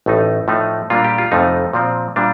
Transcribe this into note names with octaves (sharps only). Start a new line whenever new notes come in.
A1 A2 A3 D#4
A2 F3 A3 D#4
A#2 G3 A#3 D4 F4
G4
F4
F2 C3 F3 A3 D#4
A#2 F3 C4
A#2 G3 D4